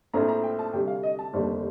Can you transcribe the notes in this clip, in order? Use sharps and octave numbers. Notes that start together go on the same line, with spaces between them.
A#1 A2 A3 C4 A#5
A#5
G5
A5
D2 C3 G3 G5
F5
D#5
A5
F1 D#2 D3 G3 C4